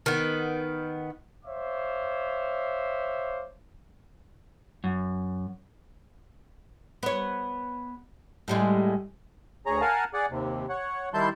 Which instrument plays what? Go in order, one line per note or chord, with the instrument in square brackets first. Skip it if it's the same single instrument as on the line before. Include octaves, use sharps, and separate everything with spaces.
[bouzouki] D#3 B3
[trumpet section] C5 C#5 E5 F5 D6
[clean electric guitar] F#2
[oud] B3 C#5
A2 G3 G#3
[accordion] D2 G#4 C#5 A#5
A#4 F5 F#5 G#5 A5
G#4 D5 F#5
D#2 C3
C#5 F#5
D#3 G3 E4 A5 C6 G6